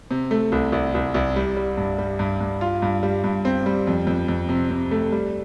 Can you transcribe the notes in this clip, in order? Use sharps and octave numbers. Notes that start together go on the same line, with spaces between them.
C3
A3
C2
C2
C2
C2
G3
G3
G2
G3
G2
G2
F4
G2
G3
G2
C4
G3
F2
F2
F2
C3
C3
A3
G3